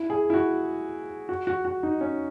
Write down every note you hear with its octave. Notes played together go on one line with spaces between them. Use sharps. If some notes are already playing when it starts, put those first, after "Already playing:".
Already playing: E4
G#4
E4
F#4
F#4
F#4
F#4
D#4
C#4